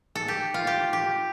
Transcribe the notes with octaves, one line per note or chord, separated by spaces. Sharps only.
A4
G4
F4
G4
G4